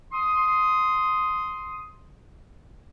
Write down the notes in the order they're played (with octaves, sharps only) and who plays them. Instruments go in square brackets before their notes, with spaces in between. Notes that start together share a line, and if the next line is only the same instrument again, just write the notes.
[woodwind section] C6 D#6